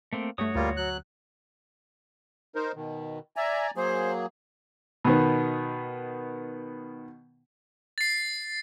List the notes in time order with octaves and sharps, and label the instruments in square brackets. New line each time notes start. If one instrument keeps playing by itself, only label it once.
[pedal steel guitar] A3 A#3 C4
[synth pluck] G2 A3 [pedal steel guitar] F#4 C#5 D#6
[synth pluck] D2 [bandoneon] G3 A#3 F4
[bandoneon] F#3 F#6
[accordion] D#4 A#4 C5
B2 D#3
[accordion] D5 G#5 A#5 [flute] E5
[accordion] F#3 A#3 G#4 [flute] C5
[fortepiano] B2 D#3 B3
[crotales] A6 C7